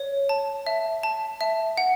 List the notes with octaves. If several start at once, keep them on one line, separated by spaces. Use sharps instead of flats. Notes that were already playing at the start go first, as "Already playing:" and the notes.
Already playing: C#5
A5
E5
A5
E5
F#5